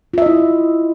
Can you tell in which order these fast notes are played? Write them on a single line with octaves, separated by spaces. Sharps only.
F4 E5 D#5 E4